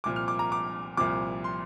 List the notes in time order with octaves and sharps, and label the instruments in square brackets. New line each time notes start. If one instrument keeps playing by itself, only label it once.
[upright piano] C2 A#2 F3 D6
F6
D6
A#5
D6
C2 A#2 F3 D6
C6